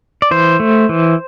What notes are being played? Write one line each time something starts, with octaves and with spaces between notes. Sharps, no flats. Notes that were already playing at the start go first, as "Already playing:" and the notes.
D5
E3 C5
A3
E3